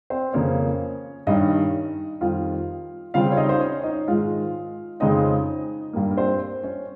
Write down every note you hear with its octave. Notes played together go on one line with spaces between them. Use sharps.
C4 C5
F2 C#3 F3 A#3 C#4 C#5
G2 D#3 G3 C#4 D#4 D#5
F2 D#3 G3 F4 F5
C#3 G3 C4 F4 F5
C#5
D#4 D#5
C5
C#4 C#5
D#4 D#5
G#2 D#3 G#3 F4 F5
F2 C#3 G#3 C4 D#4 D#5
G2 G3 A#3
A#4
C4 C5
C#4 C#5